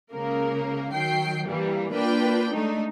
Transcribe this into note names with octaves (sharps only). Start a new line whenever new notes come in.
C#2 C#3 A#3 A#4
D#3 F#3 G5 C7
G2 E3 G3 A#3
A#3 D4 F4 B4 D5 G5
G#3 A3 D4 D#4